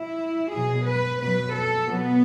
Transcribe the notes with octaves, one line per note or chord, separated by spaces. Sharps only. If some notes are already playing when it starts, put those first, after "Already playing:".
Already playing: E4
B2 F#3 G#4
B4
B2 F#3 B4
A4
B2 F#3 B3